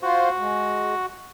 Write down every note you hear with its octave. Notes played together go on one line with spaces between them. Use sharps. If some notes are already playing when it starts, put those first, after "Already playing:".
F4 F#4 C5
G#3